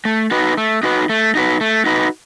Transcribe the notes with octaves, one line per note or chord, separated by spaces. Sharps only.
A3
D#4 F#4 B4
A3
D#4 F#4 B4
A3
D#4 F#4 B4
A3
D#4 F#4 B4